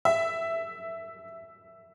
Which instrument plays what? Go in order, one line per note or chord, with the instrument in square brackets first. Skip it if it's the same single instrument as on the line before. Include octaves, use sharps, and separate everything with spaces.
[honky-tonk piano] E5